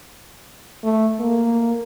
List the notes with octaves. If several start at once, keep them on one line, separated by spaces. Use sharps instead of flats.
A3
A#3